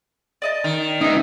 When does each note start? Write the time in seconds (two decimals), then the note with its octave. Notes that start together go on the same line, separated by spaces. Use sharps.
0.42 D5 D#5 A5
0.64 D#3
1.01 C#2 B3 D#4 E5